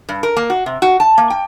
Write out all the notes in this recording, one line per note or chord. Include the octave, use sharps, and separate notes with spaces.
G2
A#4
A#3
F#4
C3
F#4
A5
A#3
G5